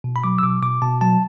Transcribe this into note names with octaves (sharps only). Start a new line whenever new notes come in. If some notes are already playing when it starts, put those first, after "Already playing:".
B2
B5
F#3 D6
E6
B2 D6
B2 D6
B2 A5
F#3 A5